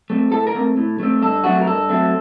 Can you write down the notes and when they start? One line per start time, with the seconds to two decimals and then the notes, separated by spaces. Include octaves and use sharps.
0.10 A3 C4
0.32 A2 A4
0.47 A#4
0.55 A3 C4
0.77 A2
1.00 A3 C4
1.22 G2 A4
1.44 F#3 A3 C4 F#4
1.61 A#4
1.67 G2 A4
1.89 F#3 A3 C4